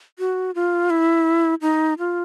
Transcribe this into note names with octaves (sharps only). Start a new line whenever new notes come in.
F#4
F4
E4
D#4
F4